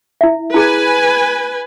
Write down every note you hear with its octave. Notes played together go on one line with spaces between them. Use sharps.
E4 E5
E4 G#4 B4 G#5